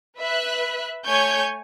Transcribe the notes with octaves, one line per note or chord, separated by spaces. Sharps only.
B4 E5 F#6
A3 C#5 G#5 C#6 G6 G#6